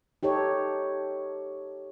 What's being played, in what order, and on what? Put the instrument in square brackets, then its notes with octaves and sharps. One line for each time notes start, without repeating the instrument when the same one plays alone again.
[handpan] D#4 G4 A4 C#5